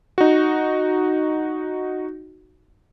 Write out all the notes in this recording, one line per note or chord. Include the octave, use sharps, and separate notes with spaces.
D#4 F#4